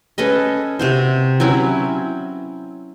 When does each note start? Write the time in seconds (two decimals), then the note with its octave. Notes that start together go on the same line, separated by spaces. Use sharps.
0.18 C#4 A4 B4 D#5
0.79 C3 F#4 C5
1.40 F#3 C4 C#4 E4